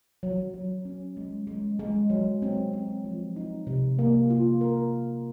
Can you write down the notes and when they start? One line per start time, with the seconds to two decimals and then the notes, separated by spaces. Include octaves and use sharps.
0.23 F#3
0.54 F#3
0.85 C#4
1.17 G#3
1.47 G#3
1.79 G#3
2.10 F#3
2.42 C4
2.73 C4
3.04 F3
3.36 D#4
3.67 C3
3.99 A#3
4.30 F4
4.61 A#4